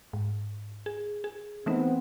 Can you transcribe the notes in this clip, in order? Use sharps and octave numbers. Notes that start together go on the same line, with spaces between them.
G#2
G#4
G#4
E3 A3 B3 C4 D#4